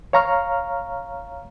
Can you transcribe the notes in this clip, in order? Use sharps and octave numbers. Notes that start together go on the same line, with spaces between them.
C#5 F5 A#5 C#6 F6